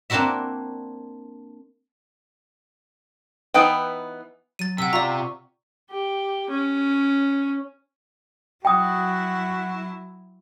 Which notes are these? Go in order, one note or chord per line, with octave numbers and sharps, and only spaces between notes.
A#3 C4 D4 E4 F#4 E5
E3 B3 D#4 B4 G5
F#3 A6 D#7
C3 F#5 E6
F4 D5 A#5 C#6
G4
C#4
F#3 E4 F#4 G5 D#6